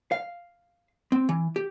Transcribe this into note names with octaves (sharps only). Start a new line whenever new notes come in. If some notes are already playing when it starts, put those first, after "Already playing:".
F5
C4
E3
G4